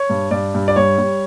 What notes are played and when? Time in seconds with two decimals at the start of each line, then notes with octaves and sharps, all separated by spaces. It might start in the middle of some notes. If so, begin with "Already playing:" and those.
Already playing: C#5
0.10 G2
0.31 G2 D5
0.55 G2
0.68 D5
0.76 G3 C#5
0.98 G3